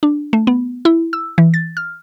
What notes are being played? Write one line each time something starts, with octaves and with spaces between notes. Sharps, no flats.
D4
A3
B3
E4
E6
E3
A6
F6